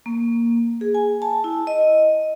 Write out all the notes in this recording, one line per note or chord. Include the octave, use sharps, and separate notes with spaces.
A#3
G#4
G#5
A5
E4
D#5